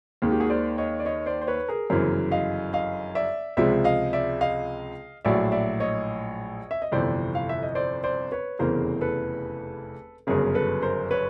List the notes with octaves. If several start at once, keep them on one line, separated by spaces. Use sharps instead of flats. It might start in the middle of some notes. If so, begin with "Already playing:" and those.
D#2 D#3 G#3 G#4
G4
F#4 G#4
C5 D5
C#5 D#5
D5
C#5 D#5
C5 D5
C5
B4 C#5
G#4 A#4
G1 F#2 C#3 E3 A#4 C5
D#5 F5
D#5 F5
D5 E5
C#2 C3 F3 G#3 D5 E5
D#5 F5
D5 E5
D#5 F5
A#1 A2 F#3 D5 E5
D5 E5
C#5 D#5
E5
D#5
G1 F2 C3 E3 C5 D5
F5
E5
D#5
C5 D5
C5 D5
B4 C#5
F1 E2 C#3 E3 A#4 C5
A4 B4
G1 F#2 C#3 G#4 A#4
A4 B4
A#4 C5
B4 C#5